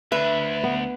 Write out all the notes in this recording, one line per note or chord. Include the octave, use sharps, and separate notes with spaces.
D2 D4 B4 E5
B3